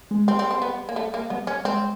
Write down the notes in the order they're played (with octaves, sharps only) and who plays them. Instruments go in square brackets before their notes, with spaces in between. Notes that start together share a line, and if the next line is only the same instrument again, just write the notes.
[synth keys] G#3
[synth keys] G3 [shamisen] C4
[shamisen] C4
C4
B3
A#3
A3
A#3
[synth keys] G3 [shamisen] B3
[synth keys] G3 [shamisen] C#4
[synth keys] G#3 [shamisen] C4